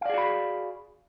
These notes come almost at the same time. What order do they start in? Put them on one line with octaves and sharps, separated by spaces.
F5 D5 G#4 F#4 B5